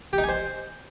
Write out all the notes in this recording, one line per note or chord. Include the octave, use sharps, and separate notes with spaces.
G4
D#4
G#5
C5